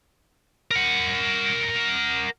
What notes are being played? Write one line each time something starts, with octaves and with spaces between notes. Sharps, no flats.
A#4 F#5